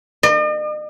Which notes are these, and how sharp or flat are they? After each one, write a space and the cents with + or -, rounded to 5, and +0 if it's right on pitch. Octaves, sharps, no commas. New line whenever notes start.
D#5 -45